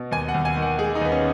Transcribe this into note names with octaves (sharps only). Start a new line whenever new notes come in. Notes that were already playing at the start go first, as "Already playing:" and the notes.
Already playing: B2
D#2 G#5
F#5
D#2
G#5
D#3
F#5
G#3 G#4
D#4
D#2 B3
C#4